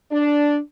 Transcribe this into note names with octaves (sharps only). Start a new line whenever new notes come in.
D4